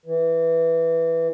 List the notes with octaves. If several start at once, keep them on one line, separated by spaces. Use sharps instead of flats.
E3